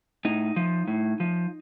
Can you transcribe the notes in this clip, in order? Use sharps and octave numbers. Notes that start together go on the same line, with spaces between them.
A2 D#4
F3
A2
F3